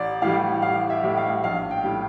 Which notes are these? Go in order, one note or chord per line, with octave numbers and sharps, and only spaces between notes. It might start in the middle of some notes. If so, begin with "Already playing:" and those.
Already playing: A1 D5
A2 E3 G3 F5
A1 F5
E5
A2 E3 G3
F5
A#1 F5
G5
A2 G3